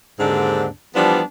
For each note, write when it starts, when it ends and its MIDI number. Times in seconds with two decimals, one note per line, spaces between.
0.19 0.66 39
0.19 0.66 44
0.19 0.66 50
0.19 0.66 60
0.19 0.66 62
0.95 1.21 52
0.95 1.21 53
0.95 1.21 55
0.95 1.21 59
0.95 1.21 62